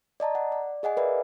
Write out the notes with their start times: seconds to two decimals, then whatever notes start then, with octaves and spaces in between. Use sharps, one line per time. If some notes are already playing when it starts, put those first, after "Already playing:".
0.20 D5 D#5 A5 A#5
0.35 F#5
0.52 D5
0.83 G#4 D#5 F#5 G#5
0.97 A#4 B4 D5 E5